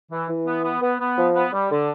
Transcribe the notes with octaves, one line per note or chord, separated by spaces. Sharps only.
E3
E3
B3
B3
B3
B3
F3
B3
G3
D3